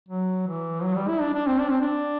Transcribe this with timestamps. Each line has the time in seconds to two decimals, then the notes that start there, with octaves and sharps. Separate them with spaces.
0.09 F#3
0.47 E3
0.83 F#3
0.96 G3
1.08 E4
1.21 D4
1.34 D4
1.47 C4
1.59 D4
1.71 C4
1.81 D4